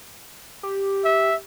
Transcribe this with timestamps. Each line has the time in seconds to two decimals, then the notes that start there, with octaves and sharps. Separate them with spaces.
0.63 G4
1.04 E5